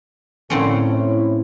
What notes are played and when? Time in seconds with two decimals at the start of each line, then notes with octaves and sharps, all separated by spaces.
0.50 A2 D3 C4 C#4
0.90 E4 C#5